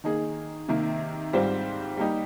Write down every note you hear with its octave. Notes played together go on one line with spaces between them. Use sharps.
D#3 A#3 D#4 G#4
C3 D#3 A#3
G#2 G3 C4 F4 C5
G3 A#3 D#4 G4